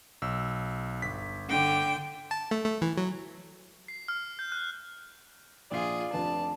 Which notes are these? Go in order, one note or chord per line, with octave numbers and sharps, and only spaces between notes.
B1 E6
G1 B6
D3 G5
A5
A3
A3
E3
F#3
C7
F6
G6
F#6
A#1 F4 G#4 D5 C7
F1 D4 B4 A5